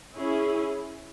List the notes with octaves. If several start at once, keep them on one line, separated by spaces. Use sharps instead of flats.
C#4 E4 G#4